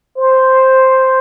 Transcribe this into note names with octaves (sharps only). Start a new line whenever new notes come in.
C5